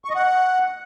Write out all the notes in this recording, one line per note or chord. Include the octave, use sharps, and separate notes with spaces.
C#6
D#5
F#5